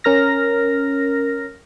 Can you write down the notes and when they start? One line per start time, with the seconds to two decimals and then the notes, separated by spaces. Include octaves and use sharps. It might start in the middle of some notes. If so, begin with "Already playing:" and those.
0.04 C#4 A#4 F6 A#6